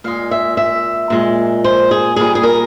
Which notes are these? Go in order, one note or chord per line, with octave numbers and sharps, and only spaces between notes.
A#2 G#3 F5
E5
E5
A#2 G#3
C5
G#4
A#2 G3 G#4
G#4
A#4